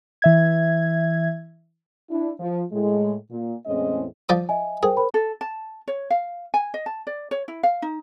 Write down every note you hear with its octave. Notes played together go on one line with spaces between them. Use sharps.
E3 E5 G#6
D4 E4
F3
A2 G#3
A#2
E2 A2 G#3 C4 C#4 D#5
F3 D5 D#6
D#5 E5 G#5
G#4 A#4 C5 G5
A#4 C5 B5
A4
A5
C#5
F5
G#5
D#5
A5
D5
C#5
E4
F5
D#4